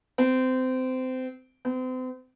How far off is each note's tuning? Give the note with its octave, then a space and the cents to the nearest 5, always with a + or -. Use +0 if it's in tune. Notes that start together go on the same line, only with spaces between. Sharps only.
C4 -25
C4 -40